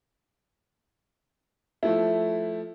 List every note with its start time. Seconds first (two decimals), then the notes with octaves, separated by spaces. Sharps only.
1.83 F3 A3 E4